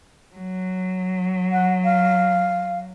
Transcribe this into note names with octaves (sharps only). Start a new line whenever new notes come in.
F#3
F#5
F5